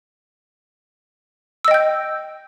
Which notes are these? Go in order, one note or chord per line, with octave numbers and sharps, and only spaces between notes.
D#5 G5 E6 G6